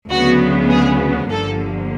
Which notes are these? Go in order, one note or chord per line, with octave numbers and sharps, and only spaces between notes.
D2 C#3 F#3 B3 F#4
G#4
G1 G2 D3 F3 A#3 A4